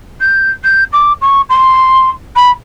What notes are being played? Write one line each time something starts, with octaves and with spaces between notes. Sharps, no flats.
G6
G6
D6
C#6
C6
B5